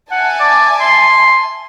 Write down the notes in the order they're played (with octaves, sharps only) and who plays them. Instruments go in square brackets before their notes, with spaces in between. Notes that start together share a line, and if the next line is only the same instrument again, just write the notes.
[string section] E5 G#5 A5 [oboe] F#5
[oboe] D5
C6